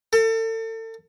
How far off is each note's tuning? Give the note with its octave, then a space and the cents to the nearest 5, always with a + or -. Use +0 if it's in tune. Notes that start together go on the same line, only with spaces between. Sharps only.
A4 +35